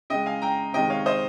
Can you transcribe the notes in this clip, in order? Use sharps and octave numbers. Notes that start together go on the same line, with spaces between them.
C#3 G#3 D#5 G5
F5 G#5
G5 A#5
C3 D#3 G#3 D#5 G5
C#5 F5
C5 D#5